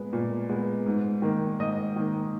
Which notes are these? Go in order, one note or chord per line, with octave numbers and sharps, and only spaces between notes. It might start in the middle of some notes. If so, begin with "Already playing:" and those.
Already playing: A#2 G#3 B3
A#2
G#3 B3
G#2
D#3 A#3
G#2 D#5
D#3 A#3